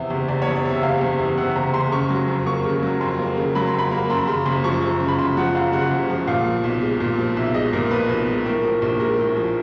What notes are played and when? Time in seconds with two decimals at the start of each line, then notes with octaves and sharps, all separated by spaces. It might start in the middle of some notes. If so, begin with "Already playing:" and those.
Already playing: E2 C3 E5
0.10 F#1
0.28 F#1 D5
0.42 C#5
0.47 E2
0.56 D5
0.65 C3 E5
0.83 F#1 F5
1.01 F#1
1.19 E2
1.37 C3 F#5
1.56 F#1 A#5
1.74 F#1 C6
1.92 C#3 C#6
2.10 F#3
2.28 F2
2.46 A#3 C#6
2.65 C#3
2.83 F#3
3.01 F2 C6
3.19 A#3
3.37 C#3
3.55 F#3 B5
3.67 C6
3.74 F2
3.79 B5
3.91 A#3
4.10 F#2 C6
4.18 B5
4.27 C#3 C6
4.46 F#1
4.64 F3 C#6
4.82 F#2
5.00 C#3
5.08 B5
5.18 F#1 C6
5.37 F3 F#5
5.55 F#2 F5
5.73 C#3 F#5
5.91 F#1
6.10 F3
6.27 A#2 F5
6.46 F3
6.64 B1
6.81 G#3
7.00 A#2
7.18 F3
7.37 B1 E5
7.54 G#3 D#5
7.73 A#2 A#4
7.91 F3 B4
8.09 B1
8.27 G#3
8.45 A2 A#4
8.63 F3
8.82 A#1
9.00 G#3 A#4
9.19 A2
9.37 F3